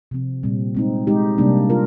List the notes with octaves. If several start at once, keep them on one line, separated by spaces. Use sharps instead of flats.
C3 F3 C4
A#2 G3 C4
G#3 C4 D#4
G#3 D#4 G4
C3 G3 A#3 D4
F4 A#4